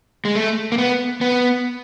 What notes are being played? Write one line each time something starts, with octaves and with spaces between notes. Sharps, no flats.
G#3
A3
A#3
B3
B3